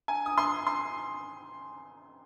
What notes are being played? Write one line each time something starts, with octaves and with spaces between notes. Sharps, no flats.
G#5
D#6
C6
C6